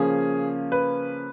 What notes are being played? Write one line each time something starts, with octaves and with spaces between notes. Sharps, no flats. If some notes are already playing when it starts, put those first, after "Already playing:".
Already playing: C#3 F3 A#3 C#4 G#4
B4